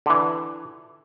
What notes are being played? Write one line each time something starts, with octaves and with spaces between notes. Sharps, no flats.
D3 E3